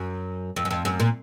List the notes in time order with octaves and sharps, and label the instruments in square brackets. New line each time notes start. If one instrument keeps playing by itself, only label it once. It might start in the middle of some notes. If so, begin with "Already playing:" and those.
Already playing: [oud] F#2
F2
F#2
F2
F#2
A#2